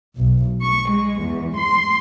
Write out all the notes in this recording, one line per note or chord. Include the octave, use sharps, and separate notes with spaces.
B1
C#6
G#3
E2
C6